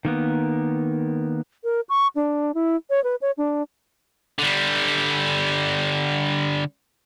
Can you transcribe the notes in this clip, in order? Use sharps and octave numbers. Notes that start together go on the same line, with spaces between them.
D#3 A#3 B3
A#4
C#6
D4
E4
C#5
B4
C#5
D4
D3 G3